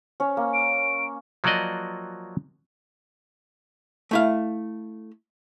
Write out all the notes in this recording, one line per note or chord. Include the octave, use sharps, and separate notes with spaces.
C#4 C#5
A#3
D7
F3 F#3 A#3 F#4 D5 D#5
A3 E4 F5